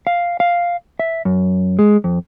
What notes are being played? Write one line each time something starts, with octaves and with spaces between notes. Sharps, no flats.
F5
F5
E5
F#2
G#3
F2